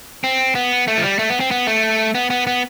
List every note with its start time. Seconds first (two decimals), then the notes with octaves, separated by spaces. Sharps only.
0.24 C4
0.55 B3
0.88 A3
0.97 F3
1.04 G3
1.19 A3
1.30 B3
1.40 C4
1.51 B3
1.67 A3
2.15 B3
2.30 B3
2.47 B3